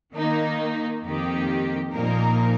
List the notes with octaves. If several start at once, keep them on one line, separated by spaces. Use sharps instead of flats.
D#3 A#3 D#4
F2 D#3 A#3 D#4 G4
A#2 F3 A#3 D#4 A#4